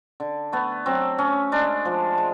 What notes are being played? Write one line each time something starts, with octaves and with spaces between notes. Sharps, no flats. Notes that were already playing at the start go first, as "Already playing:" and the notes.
D3
A3 B3
F#3 C4
A3 C#4
G#3 D4
F3
G#3